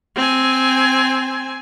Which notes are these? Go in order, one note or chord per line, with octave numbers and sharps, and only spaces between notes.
C4 G#5